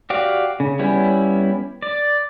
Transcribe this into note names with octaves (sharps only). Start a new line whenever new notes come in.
F#4 G4 D5 F5 F#5
C#3
G3 B3 C#4 E4
D5